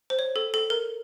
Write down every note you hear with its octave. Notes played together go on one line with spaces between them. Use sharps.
C5
C#5
A4
A4
A#4